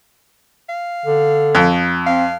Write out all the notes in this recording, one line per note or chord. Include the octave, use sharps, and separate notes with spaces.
F5
D3
F2
C4 F5